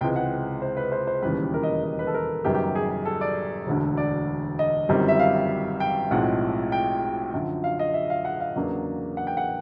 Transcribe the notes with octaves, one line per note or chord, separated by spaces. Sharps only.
C#2 C3 E3 G#3 C4 G5
F#5
C5
B4
C5
C5
E1 D#2 C#3 E3 G3 B4
A#4
D#5
D#5
B4
A4
A#4
F#1 F#2 D#3 G3 B3 G4
G4
G#4
A4
D5
E1 D2 D3
D5
D#5
G1 F#2 D#3 G3 C4
E5
F5
G5
B1 A2 F3 G#3 C4 F#5
G5
F#2 D3 F3
F5
D#5
E5
F5
F#5
F5
E2 C#3 F#3 A#3 D4
F#5
G5
F#5